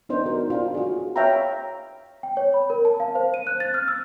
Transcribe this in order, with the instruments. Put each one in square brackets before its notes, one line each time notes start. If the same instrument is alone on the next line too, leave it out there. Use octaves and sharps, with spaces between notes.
[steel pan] B3 D4 D#4 C5
F#4 A#4
D4 F4
F#4 G#4
C#5 E5 F5 G5 A#5 B5
[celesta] G5
C#5
B5
A#4
A5
F5
C5
D#7
F#6
A6
F6
E6